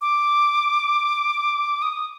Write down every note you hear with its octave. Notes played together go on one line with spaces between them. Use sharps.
D6
D#6